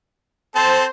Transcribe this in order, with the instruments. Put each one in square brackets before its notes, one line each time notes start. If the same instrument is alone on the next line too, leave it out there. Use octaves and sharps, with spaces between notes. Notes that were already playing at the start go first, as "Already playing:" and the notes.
[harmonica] C4 A4 A5 [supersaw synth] C5